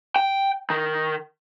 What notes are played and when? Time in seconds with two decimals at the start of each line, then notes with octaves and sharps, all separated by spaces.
0.16 G5
0.70 D#3